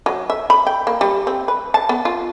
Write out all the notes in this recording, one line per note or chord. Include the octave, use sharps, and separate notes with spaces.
F#3
E5
B5
G5
A#3
G3
C4
B4
A5
B3
F4